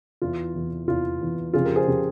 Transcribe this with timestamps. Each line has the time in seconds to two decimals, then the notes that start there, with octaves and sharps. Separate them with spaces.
0.22 E2 E3 F4
0.55 E2 E3
0.88 E2 E3 F4
1.21 E2 E3
1.53 F2 C#3 F3 F4 G#4
1.65 G4 A#4
1.76 G#4 C5
1.87 C#3 F3 G4